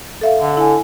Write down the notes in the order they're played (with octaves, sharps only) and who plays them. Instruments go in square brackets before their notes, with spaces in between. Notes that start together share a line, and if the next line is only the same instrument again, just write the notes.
[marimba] A4 E5 F5
[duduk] D3
[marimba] E4 G#5